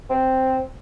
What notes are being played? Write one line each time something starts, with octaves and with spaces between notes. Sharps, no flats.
C4